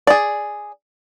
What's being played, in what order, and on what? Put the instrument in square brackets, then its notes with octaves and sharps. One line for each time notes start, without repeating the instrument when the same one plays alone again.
[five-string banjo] G#4 D5